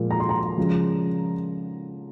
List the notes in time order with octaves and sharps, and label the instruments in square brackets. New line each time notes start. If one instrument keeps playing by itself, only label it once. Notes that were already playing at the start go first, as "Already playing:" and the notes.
Already playing: [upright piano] A#2 F3 G#3
A#5
C6
A#5
C#3 F3 G#3